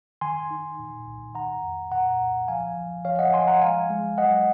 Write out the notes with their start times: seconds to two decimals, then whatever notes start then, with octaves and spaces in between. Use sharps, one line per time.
0.21 D#3 G#5 C6
0.51 D#4
0.79 A#2
1.07 C2
1.35 D#3 F#5 A#5
1.63 F2
1.91 A#2 F#5 A#5
2.20 C2
2.48 F3 F5 G#5
2.77 F3
3.05 F3 C#5 F5
3.19 D#5 F#5
3.33 F3 G#5 C6
3.48 F#5 A#5
3.62 G#3 F5 G#5
3.90 G#3
4.18 F#3 D#5 F#5